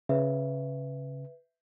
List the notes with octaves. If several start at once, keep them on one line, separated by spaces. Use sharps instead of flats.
C#3 B4 E5